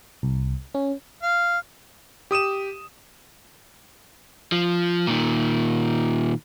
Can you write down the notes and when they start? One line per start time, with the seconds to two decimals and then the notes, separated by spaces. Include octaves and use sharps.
0.23 C2
0.75 C#4
1.22 F5
2.31 G4 D#6 D#7 E7
4.52 F3
5.07 A#2 D#3